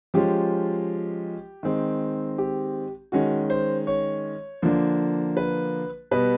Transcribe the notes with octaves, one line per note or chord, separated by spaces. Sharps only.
F3 G#3 C#4 F4 G4
D#3 G#3 C4
G4
D#3 G#3 C#4 F#4
C5
C#5
D3 F3 A#3 D4
B4
B2 G3 B3 B4